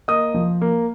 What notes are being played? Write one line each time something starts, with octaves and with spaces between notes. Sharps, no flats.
A#3 D#5 D#6
F3
A#3